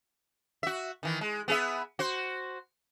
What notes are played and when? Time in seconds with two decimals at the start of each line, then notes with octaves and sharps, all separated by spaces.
0.63 F#4 E5
1.03 D#3 E3
1.21 G#3
1.48 B3 G#4 E5
1.99 F#4 C5